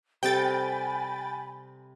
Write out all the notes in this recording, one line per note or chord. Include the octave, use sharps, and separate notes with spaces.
C3 G3 A4 G5 G#5 B5 A6